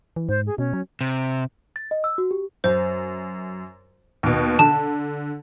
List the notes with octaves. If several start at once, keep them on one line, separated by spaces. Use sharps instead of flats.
E3
G#2 C5
G#4
B2 C#4
F#3
C3
A6
D#5
E6
F#4
G4
F#2 C5
D#2 B2
D3 A5